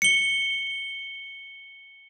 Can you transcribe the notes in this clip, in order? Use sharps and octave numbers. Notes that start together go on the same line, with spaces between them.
C#7 G7